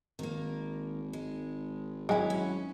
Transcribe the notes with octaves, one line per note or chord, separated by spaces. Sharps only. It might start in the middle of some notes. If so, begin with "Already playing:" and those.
G#1 D#3 A#3
G#3
F#3 G#3 E4 G#5
C#4